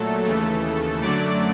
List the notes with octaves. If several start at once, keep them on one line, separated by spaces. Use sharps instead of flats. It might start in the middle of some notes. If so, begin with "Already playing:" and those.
Already playing: A#2 F#3 A3 A4
D#2 C#3 E3 A3
F#2 D3 F#3 A3 D5